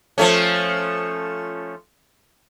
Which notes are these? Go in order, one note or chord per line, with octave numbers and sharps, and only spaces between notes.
F3 A3 C#4